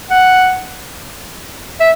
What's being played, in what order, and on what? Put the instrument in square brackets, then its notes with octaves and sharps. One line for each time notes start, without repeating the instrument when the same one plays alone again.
[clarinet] F#5
E5